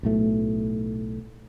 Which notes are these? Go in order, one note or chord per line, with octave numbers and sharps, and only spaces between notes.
B1 A2 A3